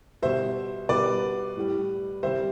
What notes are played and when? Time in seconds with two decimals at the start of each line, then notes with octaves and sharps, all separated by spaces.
0.22 B2 G3 C5 E5
0.89 B2 G3 B4 D5
1.56 A2 G3
2.23 C3 G3 C5 E5